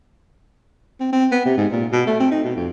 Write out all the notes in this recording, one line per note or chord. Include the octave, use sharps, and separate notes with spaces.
C4
C4
B3
C3
G#2
A#2
B2
A3
C4
D#4
B2
F2